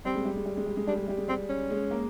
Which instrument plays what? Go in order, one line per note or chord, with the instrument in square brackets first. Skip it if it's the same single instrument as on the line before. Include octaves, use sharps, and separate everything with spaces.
[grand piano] G3 [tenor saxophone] C4
[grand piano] G#3
G3
G#3
G3
G#3
G3
G#3
[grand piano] G3 [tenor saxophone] D4
[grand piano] G#3
G3
G#3
[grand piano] G3 [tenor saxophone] C4
[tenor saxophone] C#4
[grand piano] G#3
A#3